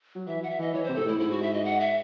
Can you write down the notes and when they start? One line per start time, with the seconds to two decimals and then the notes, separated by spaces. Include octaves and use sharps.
0.15 F#3
0.27 E3 E5
0.43 F#5
0.50 E5
0.58 E3 D#5
0.74 E3 C#5
0.84 C3 C5
0.96 G#2 A4
1.03 A2 E4
1.20 G#2 E4
1.31 F#4
1.42 E5
1.54 D#5
1.65 F#5
1.80 E5